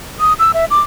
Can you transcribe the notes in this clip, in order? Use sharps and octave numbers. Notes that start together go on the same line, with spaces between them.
D#6
E6
E5
D6